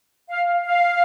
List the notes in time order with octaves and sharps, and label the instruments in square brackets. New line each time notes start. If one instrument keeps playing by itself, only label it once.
[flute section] F5
F5